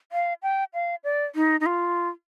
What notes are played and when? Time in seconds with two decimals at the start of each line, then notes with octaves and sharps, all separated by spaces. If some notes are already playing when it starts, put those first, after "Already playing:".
0.12 F5
0.43 G5
0.74 F5
1.04 D5
1.35 D#4
1.60 D#4
1.66 F4